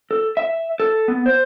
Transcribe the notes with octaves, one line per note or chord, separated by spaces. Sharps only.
A4
E5
A4
B3
C5